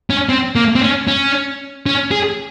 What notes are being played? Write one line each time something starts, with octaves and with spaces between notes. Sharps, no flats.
C#4
C4
A#3
C4
C#4
C#4
C#4
G#4